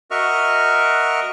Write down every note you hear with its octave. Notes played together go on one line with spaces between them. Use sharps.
F#4 A#4 D#5 E5 C#6 F6